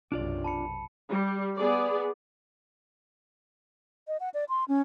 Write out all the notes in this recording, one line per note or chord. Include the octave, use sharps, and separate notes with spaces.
B1 F#2 C3 D4 F4 D5
A5 B5 C#7
G3
B3 G#4 D5
D#5
F#5
D5
C6
C#4